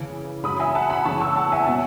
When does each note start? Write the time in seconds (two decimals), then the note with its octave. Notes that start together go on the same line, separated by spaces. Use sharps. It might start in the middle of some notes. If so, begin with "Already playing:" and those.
Already playing: C#3 E3
0.44 C#3 F#3 B5 D#6
0.59 E5 G#5
0.75 F#5 A5
0.90 G#5 B5
1.05 C#3 E3 A5 C#6
1.21 C#6 E6
1.36 F#5 A5
1.52 E5 G#5
1.67 B2 F#3 F#5 A5